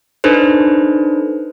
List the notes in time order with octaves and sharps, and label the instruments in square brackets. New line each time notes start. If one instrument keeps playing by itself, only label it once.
[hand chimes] D4 D#4 A4 B4 C5